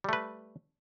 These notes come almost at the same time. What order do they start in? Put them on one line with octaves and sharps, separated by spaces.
G3 A3 B4